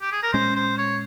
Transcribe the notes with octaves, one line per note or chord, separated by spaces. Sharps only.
G4
G#4
A#4
A#2 G#3 C#4 C5
C5
C#5